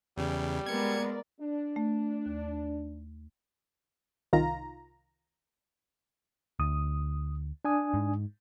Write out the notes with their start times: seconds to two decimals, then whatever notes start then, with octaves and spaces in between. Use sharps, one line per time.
0.18 E2 C#3 G3
0.66 G#3 B3 A#4 D5 G#6 C#7
1.40 D4
1.76 A3
2.26 D#2
4.33 C2 D#3 F4 A#5
6.60 D2 D#6
7.65 D4 G#5 D#6
7.94 G#2